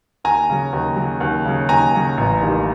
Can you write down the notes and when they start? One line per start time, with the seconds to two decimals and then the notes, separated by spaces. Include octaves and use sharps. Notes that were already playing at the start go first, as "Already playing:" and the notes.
0.24 D#2 G#5 A#5
0.49 C#3 F#3
0.73 D#2
0.96 C#3 F#3
1.21 D#2
1.45 C#3 F#3
1.69 D#2 G#5 A#5
1.94 C#3 F#3
2.17 A1
2.41 G2 D#3 G3 A#3